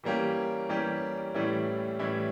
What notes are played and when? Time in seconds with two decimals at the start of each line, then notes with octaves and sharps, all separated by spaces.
0.04 E3 G3 A#3 C#4 G4
0.69 E3 G3 A#3 C#4 G4
1.34 A2 E3 G3 C#4 E4
1.99 A2 E3 G3 C#4 E4